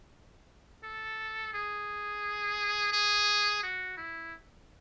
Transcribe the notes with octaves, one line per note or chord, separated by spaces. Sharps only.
A4
G#4
G#4
F#4
E4